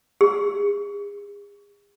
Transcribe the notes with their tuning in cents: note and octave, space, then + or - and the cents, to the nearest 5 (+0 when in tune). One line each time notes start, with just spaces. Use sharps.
G#4 -35